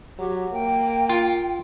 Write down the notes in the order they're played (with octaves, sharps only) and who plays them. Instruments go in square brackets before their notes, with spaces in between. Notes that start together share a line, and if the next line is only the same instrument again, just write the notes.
[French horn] F#3 [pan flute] G4
[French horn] A#3 [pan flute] G5
[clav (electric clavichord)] F4